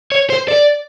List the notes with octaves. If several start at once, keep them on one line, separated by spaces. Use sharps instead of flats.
C#5
C5
D5